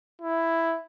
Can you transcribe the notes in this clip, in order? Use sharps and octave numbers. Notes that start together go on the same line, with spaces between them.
E4